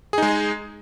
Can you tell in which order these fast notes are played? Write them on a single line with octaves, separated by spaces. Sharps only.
G#4 D#4 G#3